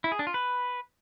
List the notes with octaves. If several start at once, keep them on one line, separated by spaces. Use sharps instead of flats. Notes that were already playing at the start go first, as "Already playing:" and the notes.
E4
G#4
D4
F4
B4